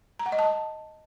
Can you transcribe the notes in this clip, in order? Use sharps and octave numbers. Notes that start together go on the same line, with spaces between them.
A#5
F#5
D#5
A5